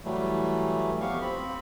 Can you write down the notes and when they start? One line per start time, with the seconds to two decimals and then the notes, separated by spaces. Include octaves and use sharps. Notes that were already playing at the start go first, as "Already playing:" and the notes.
0.05 E3 F#3 G3 A3
1.01 F2 B3 G4 F5 C#6
1.22 C4 B5